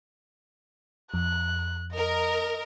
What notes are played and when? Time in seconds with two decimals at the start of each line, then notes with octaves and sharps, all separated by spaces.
1.14 F2 F#6
1.95 A#4 D#5